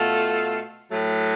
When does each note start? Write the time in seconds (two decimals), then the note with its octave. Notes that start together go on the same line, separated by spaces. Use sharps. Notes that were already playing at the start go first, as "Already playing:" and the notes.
Already playing: B2 A3 F4 A4
0.89 A2 F#3 A3